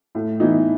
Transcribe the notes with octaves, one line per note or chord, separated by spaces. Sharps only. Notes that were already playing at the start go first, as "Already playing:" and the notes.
A2
E3 B3 D#4